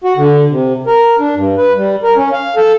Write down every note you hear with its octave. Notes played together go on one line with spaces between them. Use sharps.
F#4
D3
C3
A#4
D4
G2
B4
G3
A#4
C#4
F5
A4